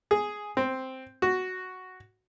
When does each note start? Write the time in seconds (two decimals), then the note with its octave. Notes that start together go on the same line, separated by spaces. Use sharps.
0.11 G#4
0.57 C4
1.22 F#4